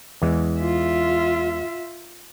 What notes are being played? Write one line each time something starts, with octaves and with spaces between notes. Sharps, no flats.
E2 E3 G#3
F4 E5